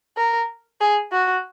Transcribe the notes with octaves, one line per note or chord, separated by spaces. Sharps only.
A#4
G#4
F#4